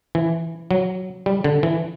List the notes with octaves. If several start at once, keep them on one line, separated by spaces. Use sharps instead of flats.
E3
F#3
G3
D3
E3